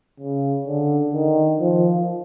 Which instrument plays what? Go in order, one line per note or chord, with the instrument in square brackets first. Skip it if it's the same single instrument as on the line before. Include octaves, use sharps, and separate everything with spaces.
[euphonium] C#3
D3
D#3
F3